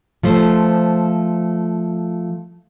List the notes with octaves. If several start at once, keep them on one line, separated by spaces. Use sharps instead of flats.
F3 A3 C5